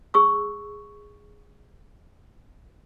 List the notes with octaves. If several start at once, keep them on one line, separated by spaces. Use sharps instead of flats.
G#4 C#6 E6